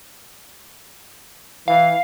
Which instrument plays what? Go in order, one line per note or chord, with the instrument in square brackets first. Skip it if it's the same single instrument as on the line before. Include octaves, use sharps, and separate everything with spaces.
[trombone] E3 [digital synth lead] F5